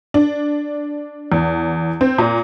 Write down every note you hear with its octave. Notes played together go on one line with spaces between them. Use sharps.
D4
E2
C4
A#2